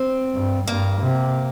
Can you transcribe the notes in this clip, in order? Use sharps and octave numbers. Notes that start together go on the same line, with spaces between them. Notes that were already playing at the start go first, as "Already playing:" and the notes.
Already playing: C4
G2
G2 A#3
C3